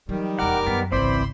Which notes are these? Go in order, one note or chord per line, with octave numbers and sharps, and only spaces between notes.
D#3 E3 F#3 G3
D#1 E2 A#4 F#5 D6 F6
F#2 B3
G#1 C#2 E3 C4 C5 D5 B5 C6